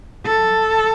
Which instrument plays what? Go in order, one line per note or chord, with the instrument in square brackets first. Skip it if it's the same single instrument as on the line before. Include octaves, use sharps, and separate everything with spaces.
[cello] A4